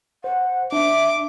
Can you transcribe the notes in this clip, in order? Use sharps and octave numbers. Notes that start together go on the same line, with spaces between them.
C5 F#5
D4 E5 D6